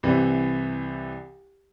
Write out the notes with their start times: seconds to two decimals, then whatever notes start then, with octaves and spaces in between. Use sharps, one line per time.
0.03 C2 C3 E3